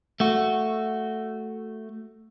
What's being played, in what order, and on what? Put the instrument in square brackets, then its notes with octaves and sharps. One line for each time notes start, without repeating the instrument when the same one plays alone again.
[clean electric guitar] A3 F#4